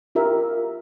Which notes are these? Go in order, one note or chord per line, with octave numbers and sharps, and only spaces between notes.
F4 G4 A#4 E5